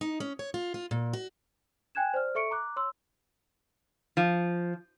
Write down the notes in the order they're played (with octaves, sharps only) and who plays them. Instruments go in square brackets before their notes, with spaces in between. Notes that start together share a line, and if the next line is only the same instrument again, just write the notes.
[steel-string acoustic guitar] D#4
C#4
C#5
F4
F4
A#2
F#4
[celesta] G5 G#5 F#6 G#6 E7
C5 D5 F6
A4 E5 C#6 C#7 D7
A#5 D6 F#6
C#5 C6 E6
[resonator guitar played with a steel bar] F3